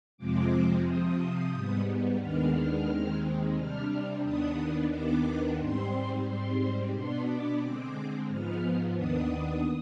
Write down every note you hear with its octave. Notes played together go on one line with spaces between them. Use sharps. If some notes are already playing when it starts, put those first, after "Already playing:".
F2 C3 F3 G#3 C4 D6
C3 F3 C4 D#6
G#2 G3 B3
D#2 D#3 G#3 B3 D4 F6
D#2 D#3 G#3 C4
C3 G3 D4 F6
D#2 D#3 B3 D4 D#6
D#2 D#3 B3 D4 D6
G#2 G3 C4 C6
G#2 G3 C4 C6
B2 B3 D4 C6
D6
D3 G#3 C4 D6
G#2 F3 B3 F6
D#2 D#3 B3 D4 D#6